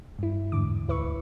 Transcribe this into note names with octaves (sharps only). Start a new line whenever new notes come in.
G2 E4
E2 G#2 D3 D6
D2 E4 B4 E5 C#6